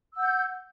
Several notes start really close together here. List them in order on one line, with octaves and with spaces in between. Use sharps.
E6 F#5 G6